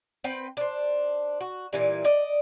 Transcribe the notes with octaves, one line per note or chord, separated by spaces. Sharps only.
C4 B4 G5
D4 C5
F#4
A#2 E3 G3
D5 D#5